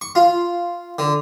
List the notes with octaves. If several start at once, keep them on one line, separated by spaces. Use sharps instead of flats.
C#6
F4
D3